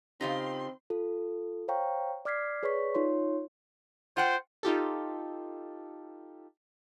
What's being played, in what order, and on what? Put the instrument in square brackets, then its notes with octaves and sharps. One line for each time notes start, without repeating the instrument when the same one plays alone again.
[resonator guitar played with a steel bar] C#3 F4 G4 [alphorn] C4 [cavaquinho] D#4 [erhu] C6
[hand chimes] F4 A4
C5 C#5 F5 G5 A#5 C#6
D5 D6 F6 G#6 B6 C7
G#4 B4 C#5 D5 C#6 B6
D#4 F4 C#5 C6
[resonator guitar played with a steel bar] F4 F#5 G5 [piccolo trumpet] C5
[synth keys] D#4 F4 G4 A4